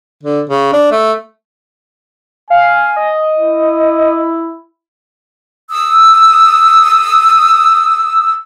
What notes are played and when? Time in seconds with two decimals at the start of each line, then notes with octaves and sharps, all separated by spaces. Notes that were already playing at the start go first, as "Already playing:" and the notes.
0.23 D3
0.49 C#3
0.73 D4
0.91 A3
2.50 F5 G#5
2.96 D#5
3.37 E4
5.71 D#6 E6